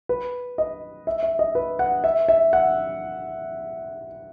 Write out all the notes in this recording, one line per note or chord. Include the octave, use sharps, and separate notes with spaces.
B4
D#5
E5
E5
D#5
B4
F#5
E5
E5
F#5